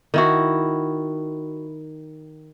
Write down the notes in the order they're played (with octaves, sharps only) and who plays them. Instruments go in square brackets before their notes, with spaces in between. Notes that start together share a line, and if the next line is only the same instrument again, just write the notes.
[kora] D#3 E4 F#4